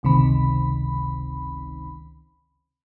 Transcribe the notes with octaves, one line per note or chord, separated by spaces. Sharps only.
G1 C#2 C3 D#3 B5